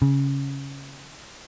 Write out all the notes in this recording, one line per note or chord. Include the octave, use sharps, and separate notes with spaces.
C#3